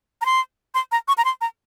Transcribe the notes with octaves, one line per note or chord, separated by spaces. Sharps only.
A#5
C6
C6
A#5
C#6
A#5
C6
A#5